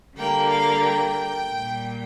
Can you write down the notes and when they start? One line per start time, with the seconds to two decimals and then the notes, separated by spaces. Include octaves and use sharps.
0.15 D3 G3 A#3 G5
0.49 F5
0.83 G5
1.50 A#2 G3 A#3